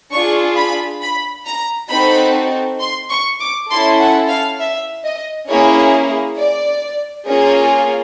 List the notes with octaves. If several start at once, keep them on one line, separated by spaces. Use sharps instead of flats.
D4 F4 G#4 C#6
B5
B5
A#5
C4 D#4 F#4 A4 B5
C6
C#6
D6
C#4 E4 A4 C6
F#5
F5
E5
D#5
A#3 C#4 E4 G#4 C#5
D5
A#3 C#4 F4 G#4